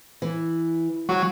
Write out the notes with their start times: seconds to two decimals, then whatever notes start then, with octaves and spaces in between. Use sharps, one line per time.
0.22 E3
1.09 F#3